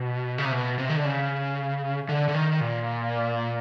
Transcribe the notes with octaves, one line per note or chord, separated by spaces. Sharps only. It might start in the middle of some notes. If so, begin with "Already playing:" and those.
Already playing: B2
C#3
C3
B2
C3
D#3
D3
C#3
D3
D3
D#3
A#2